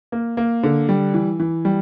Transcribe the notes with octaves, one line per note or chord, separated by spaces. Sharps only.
A#3
A#3
D3
G3
E3
E3
G3